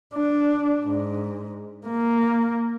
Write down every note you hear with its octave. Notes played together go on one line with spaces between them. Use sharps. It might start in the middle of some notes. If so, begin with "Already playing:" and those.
D4
G#2
A#3